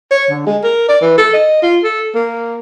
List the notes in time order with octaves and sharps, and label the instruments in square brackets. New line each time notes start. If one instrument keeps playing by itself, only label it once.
[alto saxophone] C#5
D3
G#3
A#4
D5
E3
A4
D#5
F4
A4
A#3